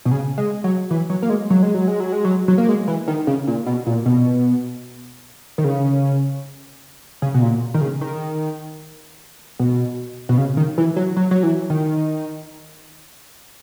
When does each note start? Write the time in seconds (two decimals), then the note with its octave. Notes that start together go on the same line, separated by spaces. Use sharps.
0.05 B2
0.11 C#3
0.38 G#3
0.64 F#3
0.91 E3
1.10 F#3
1.22 A#3
1.30 G#3
1.50 F#3
1.63 G#3
1.75 F#3
1.88 G#3
2.00 F#3
2.12 G#3
2.25 F#3
2.48 F#3
2.58 A#3
2.69 G#3
2.88 E3
3.08 D#3
3.27 C#3
3.47 A#2
3.66 B2
3.87 A#2
4.06 B2
5.58 D#3
5.64 C#3
7.22 C#3
7.34 B2
7.42 A#2
7.74 D#3
7.81 C#3
8.01 D#3
9.59 B2
10.29 B2
10.38 C#3
10.57 D#3
10.78 E3
10.96 F#3
11.17 F#3
11.31 F#3
11.43 E3
11.70 D#3